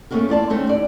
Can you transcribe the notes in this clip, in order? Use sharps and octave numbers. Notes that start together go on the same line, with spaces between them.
A3 A#3 C#4 D4 F#4 A#4
E2 F4 D5 A5
D#3 A3 C4 C#4
D#2 D5